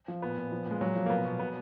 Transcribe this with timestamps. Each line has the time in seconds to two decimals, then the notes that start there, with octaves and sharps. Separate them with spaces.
0.08 F3
0.22 A#2 B3
0.37 A#2
0.52 F3
0.66 A#2 G#3
0.81 A#2 F#3
0.96 F3
1.06 A#3
1.10 B2 B3
1.25 B2
1.39 B2 B3